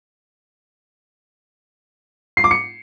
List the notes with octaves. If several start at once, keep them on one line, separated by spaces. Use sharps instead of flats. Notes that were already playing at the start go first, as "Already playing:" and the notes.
C7
D6
C#7